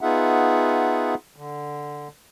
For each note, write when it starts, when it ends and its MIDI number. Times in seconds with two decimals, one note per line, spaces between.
0.01 1.15 59
0.01 1.15 63
0.01 1.15 65
0.01 1.15 68
0.01 1.15 76
0.01 1.15 78
1.36 2.08 50